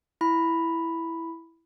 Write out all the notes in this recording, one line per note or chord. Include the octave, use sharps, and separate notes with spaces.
E4 B5